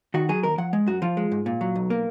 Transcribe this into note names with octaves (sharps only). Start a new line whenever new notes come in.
D#3 F#4
F#3 G#4
D#2 A#4
F3 F#5
G#3
F#2 F#4
F3 F4
G#3
G#2
A#2
F#3
B1
A#3